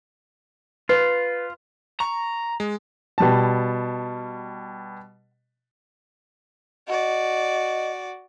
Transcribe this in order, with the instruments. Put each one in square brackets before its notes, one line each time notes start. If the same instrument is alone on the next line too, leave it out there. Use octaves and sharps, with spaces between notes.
[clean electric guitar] F4 [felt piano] B4
[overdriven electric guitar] A#5 [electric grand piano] C#6
[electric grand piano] G#3
[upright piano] B2 G3 A5
[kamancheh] F#4 D5 [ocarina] D#5